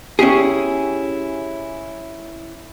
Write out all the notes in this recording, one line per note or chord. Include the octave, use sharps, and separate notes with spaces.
C#4 E4 G4 G#4